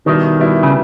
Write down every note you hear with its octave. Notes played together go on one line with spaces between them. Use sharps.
B2 D#3 G3 B3 E4
B2 G3 B3 E4
C#3